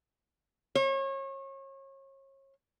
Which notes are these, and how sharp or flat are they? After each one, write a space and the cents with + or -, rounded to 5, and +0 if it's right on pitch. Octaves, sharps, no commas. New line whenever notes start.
C#5 -35